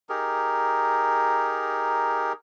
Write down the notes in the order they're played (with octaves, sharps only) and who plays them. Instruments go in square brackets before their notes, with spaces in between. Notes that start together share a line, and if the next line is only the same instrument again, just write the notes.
[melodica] D#4 G4 G#4 A#4